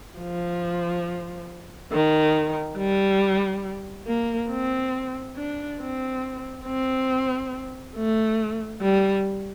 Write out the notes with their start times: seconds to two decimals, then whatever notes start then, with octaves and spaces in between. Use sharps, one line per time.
0.19 F3
1.92 D#3
2.78 G3
4.07 A#3
4.50 C4
5.37 D4
5.80 C4
6.65 C4
7.96 A3
8.81 G3